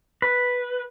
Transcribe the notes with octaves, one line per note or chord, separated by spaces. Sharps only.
B4